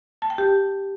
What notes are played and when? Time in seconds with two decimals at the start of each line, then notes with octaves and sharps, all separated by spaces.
0.22 A5
0.30 G5
0.38 G4